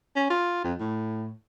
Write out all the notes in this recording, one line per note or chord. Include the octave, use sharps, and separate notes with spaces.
C#4
F4
F2
A2